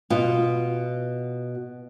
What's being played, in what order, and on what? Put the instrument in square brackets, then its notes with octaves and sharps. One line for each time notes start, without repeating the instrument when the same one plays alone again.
[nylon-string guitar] B2 F4